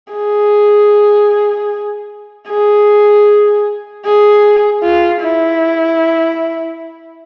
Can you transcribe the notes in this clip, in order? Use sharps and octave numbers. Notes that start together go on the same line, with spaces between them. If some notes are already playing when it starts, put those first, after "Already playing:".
G#4
G#4
G#4
F4
E4